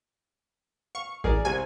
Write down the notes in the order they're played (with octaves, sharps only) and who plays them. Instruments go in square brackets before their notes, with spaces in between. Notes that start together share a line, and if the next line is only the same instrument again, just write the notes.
[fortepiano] F5 [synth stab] C#6
[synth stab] A1 [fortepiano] G#4 A#4 D5
[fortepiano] C2 C3 [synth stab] G#5